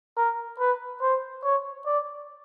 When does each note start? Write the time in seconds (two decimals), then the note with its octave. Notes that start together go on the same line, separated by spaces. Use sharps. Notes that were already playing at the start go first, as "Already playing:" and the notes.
0.17 A#4
0.59 B4
1.02 C5
1.44 C#5
1.86 D5